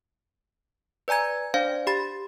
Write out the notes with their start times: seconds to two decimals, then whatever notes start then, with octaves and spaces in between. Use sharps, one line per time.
1.08 B4 D5 G#5 A#5 G#6
1.54 D4 C5 D5 F5
1.87 G4 B5 A6